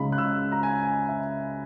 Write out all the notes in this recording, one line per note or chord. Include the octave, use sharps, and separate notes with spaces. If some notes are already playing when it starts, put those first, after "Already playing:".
Already playing: C#2 C#3 G#3 D#4 B5
F#6
E6
A#5
G#5
G#5
E5